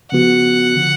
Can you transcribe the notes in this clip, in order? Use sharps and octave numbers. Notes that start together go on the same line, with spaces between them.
C#3 F3 B3 F#4 F#5
D3 F3